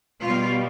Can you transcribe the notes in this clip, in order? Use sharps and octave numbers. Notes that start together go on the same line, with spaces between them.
B2 G3 F4